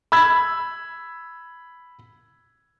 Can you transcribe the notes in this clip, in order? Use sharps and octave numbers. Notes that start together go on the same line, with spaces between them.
B5 E6 G#6